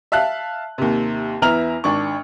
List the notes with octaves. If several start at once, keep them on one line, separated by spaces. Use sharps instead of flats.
E5 F5 A5 F#6
D#2 C3
E2 B3 E4 A#5 F6 F7
G#1 D4 C#6